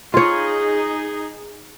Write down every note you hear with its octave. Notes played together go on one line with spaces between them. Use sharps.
D#4 F4 G#4 C#5